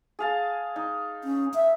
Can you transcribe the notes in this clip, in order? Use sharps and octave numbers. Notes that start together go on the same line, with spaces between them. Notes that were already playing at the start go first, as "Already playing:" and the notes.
G#4 F5 A5
D#4
C#4
E5